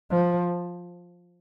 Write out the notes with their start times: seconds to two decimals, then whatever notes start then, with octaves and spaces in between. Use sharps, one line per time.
0.10 F3